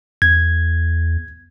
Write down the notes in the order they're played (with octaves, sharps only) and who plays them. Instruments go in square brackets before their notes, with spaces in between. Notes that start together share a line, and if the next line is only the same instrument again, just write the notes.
[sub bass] E2 [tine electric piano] G#6